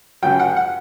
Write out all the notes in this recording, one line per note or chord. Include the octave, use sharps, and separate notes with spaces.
F#2 C#3 F#3 G5
F#5
F#5